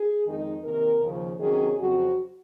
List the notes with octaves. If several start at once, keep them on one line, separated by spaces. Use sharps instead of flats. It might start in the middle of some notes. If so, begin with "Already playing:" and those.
Already playing: G#4
F2 D#3 G#3 D#4
C3 D#3 A#3 A#4
D#2 C#3 F3
C3 D#3 F#3 C#4 G#4
F2 C#3 F#3 C4 F#4